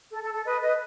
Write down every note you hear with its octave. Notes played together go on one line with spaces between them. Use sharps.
A4
A4
A4
B4 D#5
B4 D#5